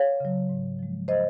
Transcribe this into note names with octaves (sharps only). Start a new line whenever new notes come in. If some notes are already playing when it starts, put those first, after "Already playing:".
Already playing: C#5 F5
C#3 F#3
G#2
F3 G#3
C5 D#5